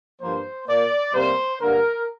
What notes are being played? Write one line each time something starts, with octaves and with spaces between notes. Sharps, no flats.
G2 F3 A#3 C5
A#2 A#3 D5
C3 G3 A#3 C5
G2 D3 A#3 A#4